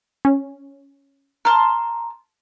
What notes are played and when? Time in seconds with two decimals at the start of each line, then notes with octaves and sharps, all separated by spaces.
0.25 C#4
1.45 A5 A#5 C6 F6